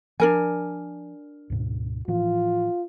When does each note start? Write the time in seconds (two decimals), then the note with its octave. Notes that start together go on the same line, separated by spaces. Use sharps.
0.20 F3 D4 A#4 G#5
1.50 D2 G#2 B2
2.08 A2 E3 F3 F4